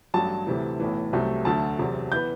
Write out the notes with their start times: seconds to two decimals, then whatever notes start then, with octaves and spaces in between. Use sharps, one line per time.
0.14 A1 G2 F#3 A5
0.47 D2 C3 E3
0.80 B1 A2 E3
1.13 C2 C3 F#3 A3
1.45 D2 D3 F#3 A3 A5
1.79 E2 C3 F#3
2.12 E3 B3 G6